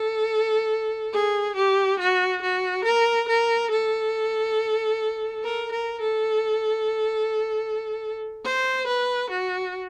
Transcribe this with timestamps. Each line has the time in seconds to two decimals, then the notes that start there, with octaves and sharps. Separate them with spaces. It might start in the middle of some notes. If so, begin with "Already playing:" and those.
Already playing: A4
1.13 G#4
1.56 G4
1.99 F#4
2.42 F#4
2.84 A#4
3.28 A#4
3.71 A4
5.44 A#4
5.72 A#4
6.01 A4
8.44 C5
8.87 B4
9.30 F#4